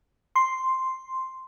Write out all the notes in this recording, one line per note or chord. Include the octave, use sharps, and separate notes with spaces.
C6